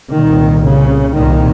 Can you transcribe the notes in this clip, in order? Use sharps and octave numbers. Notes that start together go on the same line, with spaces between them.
C2 A#2 D#3
C#3
C2 A#2 D#3